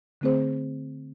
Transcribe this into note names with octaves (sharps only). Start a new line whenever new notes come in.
D3 A3 C4 G#4 C5